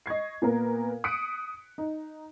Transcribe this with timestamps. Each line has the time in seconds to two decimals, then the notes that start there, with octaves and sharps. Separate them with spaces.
0.06 D#5 C#6 G#6 C7
0.42 A#2 B3 A#4
1.04 D#6 F#6 B6 C#7 D7
1.78 D#4